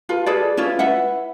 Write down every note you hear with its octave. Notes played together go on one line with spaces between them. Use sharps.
F4 A4 B4
G#4 A4 B4 D5
C#4 E4 F4 B4
E4 B4 E5 F#5